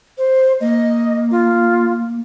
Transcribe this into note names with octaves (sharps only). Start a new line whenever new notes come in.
C5
A#3 D#5
F4